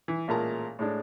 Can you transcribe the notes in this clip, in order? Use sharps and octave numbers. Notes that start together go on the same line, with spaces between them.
E3
A1 A#2 G#3 A#4 A5 A#5
A2 G#3 D4